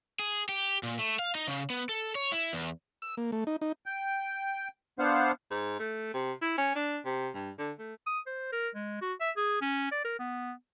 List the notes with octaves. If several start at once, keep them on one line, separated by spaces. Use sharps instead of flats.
G#4
G4
A#2
A3
F5
D#4
C#3
B3
A4
C#5
E4
E2
E6
A#3
A3
D#4
D#4
G5
B3 D4 C5 F5 F#5
G#2
A3
C3
E4
C#4
D4
C3
G2
D3
A3
D#6
C5
A#4
G#3
F#4
E5
G#4
C#4
D5
A#4
B3